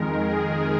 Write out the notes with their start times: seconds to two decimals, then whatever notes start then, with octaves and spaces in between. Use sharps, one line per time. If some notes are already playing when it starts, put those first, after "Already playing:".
Already playing: F2 D#3 G#3 A#4
0.15 G#4